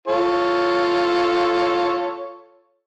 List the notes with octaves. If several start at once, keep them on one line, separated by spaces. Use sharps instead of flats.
F4 A4 C#5